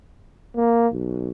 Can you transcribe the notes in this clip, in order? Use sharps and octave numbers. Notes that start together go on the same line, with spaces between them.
A#3
B1